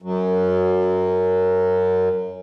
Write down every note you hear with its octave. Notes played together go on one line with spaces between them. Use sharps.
F#2 F#3